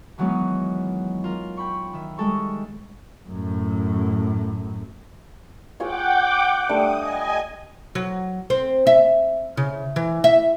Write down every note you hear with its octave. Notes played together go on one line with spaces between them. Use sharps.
D#3 E3 F#3 G#3 B3 D#4
F4 A#4
G5 B5 C#6
D#3 E5
G3 G#3 A4 C#6
F#2 A2
F4 G#4 C#5 F#5 G5 D6
G3 A3 D4 D#6
D#5 G#5
F#3
C4
E5
C#3
E3
E5